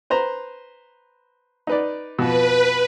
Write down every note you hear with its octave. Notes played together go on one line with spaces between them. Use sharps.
B4 C5 A#5
D#4 B4 D5
F2 B2 B4